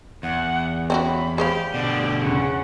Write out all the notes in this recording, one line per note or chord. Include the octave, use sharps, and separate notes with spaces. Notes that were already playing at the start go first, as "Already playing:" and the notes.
E2 F#5
C4 C#4 F#4 B5
G4 G#4 C5 F5
B2 D3 D5
E2 C#3 F#5